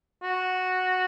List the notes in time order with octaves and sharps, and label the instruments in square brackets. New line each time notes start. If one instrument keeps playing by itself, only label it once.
[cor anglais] F#4